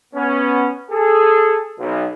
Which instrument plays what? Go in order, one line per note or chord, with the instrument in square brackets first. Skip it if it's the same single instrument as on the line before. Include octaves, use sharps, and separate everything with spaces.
[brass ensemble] B3 C#4
G#4 A4
B1